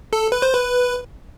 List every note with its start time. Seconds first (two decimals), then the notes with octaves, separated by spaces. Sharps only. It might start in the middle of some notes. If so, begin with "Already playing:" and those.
0.13 A4
0.32 B4
0.42 C5
0.54 B4